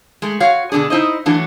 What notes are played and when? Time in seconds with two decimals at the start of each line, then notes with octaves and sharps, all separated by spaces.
0.22 G#3 A3
0.40 F#4 C#5 F5
0.72 B2 D3 E3 D4 G#4
0.90 D#4 E4 C5 D#5
1.26 E3 F#3 A3 D4